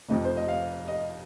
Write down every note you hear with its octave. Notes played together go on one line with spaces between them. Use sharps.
F1 F2 F3 D#5
C5
D#5
F5
D#5